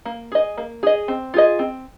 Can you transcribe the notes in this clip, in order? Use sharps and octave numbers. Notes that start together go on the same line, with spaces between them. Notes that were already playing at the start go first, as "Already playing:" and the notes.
A#3
G#4 D#5
A#3
G#4 D#5
C4
F4 G#4 D#5
C4